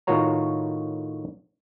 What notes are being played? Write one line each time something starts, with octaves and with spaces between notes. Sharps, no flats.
A2 D#3 F4 F#4 C#5 A#5